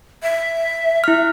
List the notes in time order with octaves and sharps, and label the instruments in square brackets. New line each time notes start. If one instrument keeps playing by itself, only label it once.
[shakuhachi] E5
[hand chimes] E4 F6